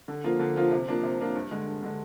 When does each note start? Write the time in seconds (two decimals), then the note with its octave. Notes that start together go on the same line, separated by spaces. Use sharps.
0.08 D3
0.24 F3 A#3 F4
0.40 D3
0.56 F3 A#3 F4
0.72 C3
0.88 F3 A#3 D4 F4
1.03 C3
1.19 F3 A#3 D4 F4
1.35 G2
1.51 D3 G#3
1.67 G2
1.83 D3 G#3